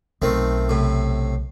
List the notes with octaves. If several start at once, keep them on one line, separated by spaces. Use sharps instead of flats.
B1 D#3 A3 C4
A2 C3